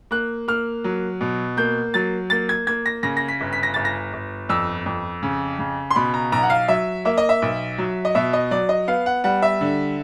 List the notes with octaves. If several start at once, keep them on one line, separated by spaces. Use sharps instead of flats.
A#3 F#6
A#3 F6
F#3
B2
A#3 G6
F#3 A6
A#3 A6
G#6
A#3 G#6
A#6
C#3 A#6
A#6
B6
G1
B6
A#6
G1 A6
A#6
G1
F2 E6
F2
C#3
C#3
C6
B2 B5
A#5
B1 A#5
F#5
F5
F#3 E5
A#3 E5
D#5
E5
B1
F#3
D#5
B2 E5
D#5
F#3 D5
D#5
B3 F5
F#5
G3 F#5
E5
D3